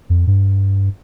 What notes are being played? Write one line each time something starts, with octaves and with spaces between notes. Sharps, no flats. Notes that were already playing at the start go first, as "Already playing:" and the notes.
F2
G2